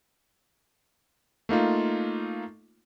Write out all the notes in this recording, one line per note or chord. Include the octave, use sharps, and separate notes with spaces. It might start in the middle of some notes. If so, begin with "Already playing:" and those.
A3 A#3 D#4 F4